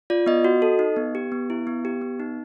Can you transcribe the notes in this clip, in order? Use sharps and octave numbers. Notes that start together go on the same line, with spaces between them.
F4 D5
B3 D#5
F#4
A4
D#4
B3
G4
B3
E4
B3
G4
B3
D#4